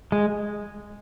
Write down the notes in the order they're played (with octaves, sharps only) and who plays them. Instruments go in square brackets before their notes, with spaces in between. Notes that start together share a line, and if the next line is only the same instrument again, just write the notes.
[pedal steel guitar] G#3